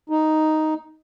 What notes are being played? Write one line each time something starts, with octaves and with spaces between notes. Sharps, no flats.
D#4